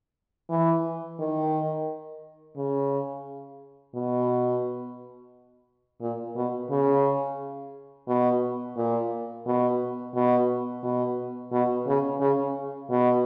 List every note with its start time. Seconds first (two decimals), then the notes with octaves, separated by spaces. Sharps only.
0.50 E3
1.19 D#3
2.56 C#3
3.94 B2
6.01 A#2
6.36 B2
6.70 C#3
8.08 B2
8.76 A#2
9.46 B2
10.15 B2
10.83 B2
11.52 B2
11.87 C#3
12.20 C#3
12.90 B2